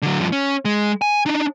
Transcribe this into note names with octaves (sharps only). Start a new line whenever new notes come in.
D3 F#3
G2 F3
C#4
G#3
G#5
D4 D#4